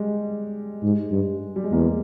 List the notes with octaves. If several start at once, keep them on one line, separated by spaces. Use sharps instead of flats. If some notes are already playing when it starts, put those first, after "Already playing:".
Already playing: G3 G#3
G#2
G2
G3
G#3
E2 A#3